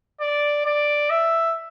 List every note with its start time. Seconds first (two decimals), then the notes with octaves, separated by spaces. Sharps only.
0.21 D5
0.65 D5
1.10 E5